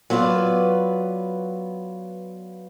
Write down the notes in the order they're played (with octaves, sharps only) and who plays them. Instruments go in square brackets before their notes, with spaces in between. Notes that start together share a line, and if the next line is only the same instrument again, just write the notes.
[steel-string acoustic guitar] F#3 B3 F4 B4 D5